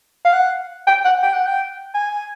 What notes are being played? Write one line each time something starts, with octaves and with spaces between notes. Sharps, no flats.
F5
F#5
G5
F#5
G5
F#5
G5
G#5